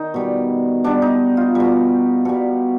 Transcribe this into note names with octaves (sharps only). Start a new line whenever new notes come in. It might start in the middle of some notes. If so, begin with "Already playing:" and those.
Already playing: D#3 D#4
B2 G3
B2 G3 D4
D#4
F4
B2 G3
B2 G3